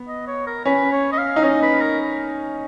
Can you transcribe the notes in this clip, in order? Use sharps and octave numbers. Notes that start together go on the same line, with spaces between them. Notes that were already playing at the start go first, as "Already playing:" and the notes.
Already playing: B3
D#5
C#5
A#4
C#4 B4
C#5
D#5
F5
D#4
C#4 D#5
B4
A#4